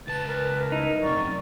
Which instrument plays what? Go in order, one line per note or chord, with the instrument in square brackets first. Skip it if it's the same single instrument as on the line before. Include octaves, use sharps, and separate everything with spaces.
[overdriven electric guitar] C#2 A5 [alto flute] B4 [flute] A6
[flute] A#4 [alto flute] B4
[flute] A#4
[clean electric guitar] D#4 [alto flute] E4
[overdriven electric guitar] F#2 C3 [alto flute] D5 [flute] C#6